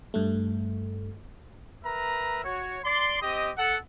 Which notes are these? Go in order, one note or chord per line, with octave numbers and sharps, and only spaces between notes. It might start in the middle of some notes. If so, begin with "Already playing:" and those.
G2 A3
A#4 B4 E5 A#5
F#4 C#5
D5 C6
C4 G4 D#5
A4 F#5